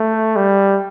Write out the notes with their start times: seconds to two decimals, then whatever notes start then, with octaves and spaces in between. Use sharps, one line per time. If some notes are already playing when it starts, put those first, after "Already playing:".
Already playing: A3
0.36 G3